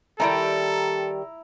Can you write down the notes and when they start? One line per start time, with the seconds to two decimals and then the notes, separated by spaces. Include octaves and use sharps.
0.20 D3 D#3 G3 E4 A4 A#5